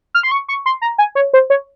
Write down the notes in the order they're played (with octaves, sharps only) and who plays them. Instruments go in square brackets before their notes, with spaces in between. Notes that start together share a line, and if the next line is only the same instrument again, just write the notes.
[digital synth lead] F6
C6
C#6
C#6
C6
A#5
G#5
C#5
C5
C#5